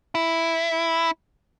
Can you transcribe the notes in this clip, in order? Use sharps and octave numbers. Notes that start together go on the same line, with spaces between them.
E4